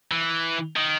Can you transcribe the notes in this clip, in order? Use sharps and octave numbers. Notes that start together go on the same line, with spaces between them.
E3
D#3